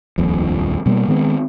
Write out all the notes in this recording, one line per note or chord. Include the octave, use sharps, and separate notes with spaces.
D#1 A#1 F2
B2 G3 A3 A#3
D#3 G#3 B3 C4